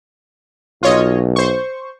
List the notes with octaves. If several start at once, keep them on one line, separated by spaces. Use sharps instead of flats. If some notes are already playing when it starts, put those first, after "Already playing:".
B1 F4 C#5 D#5
C5 C#6